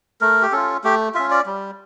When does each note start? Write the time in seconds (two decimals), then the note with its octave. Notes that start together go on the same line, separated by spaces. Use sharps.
0.21 A3 A#4
0.42 G4
0.52 C#4 F4 A4
0.84 A3 G4
1.14 C#4 F4 E5
1.31 D5
1.46 G3